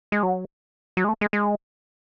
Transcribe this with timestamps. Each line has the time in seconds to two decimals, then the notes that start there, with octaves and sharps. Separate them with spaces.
0.12 G#3
0.23 F#3
0.97 F#3
1.04 G#3
1.09 A3
1.21 G#3
1.33 G#3